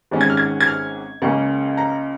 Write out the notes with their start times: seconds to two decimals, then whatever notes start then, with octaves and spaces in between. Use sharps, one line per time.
0.11 G#1 G#2 D#3 G#3 C#4
0.21 G#6
0.30 F6
0.37 G#6
0.61 G#6
0.67 F6
1.22 C#2 C#3 A#3 C#4 C#6
1.77 A#5